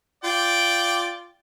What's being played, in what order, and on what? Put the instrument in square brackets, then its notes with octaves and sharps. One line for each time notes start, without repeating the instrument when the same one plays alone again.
[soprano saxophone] F4 [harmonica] D5 G5